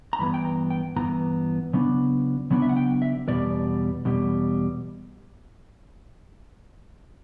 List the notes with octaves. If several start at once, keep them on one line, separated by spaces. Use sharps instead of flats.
A#5
G2 E3 B3 B5
G5
A#5
G5
G2 E3 B3 A#5
C#3 F#3 B3 D4
C#3 F#3 B3 D4
E5
F#5
G5
E5
E2 B2 G3 D5
E2 B2 G3